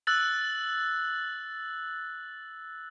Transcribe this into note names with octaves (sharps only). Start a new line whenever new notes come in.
E6 F#6 A6 F#7